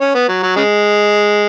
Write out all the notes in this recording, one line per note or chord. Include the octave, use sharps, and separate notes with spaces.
C#4
B3
F#3
F#3
C#3 G#3